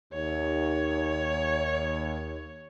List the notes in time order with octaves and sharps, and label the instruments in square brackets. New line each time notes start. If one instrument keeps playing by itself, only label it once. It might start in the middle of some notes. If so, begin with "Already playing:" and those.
[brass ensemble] D#2 [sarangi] C#5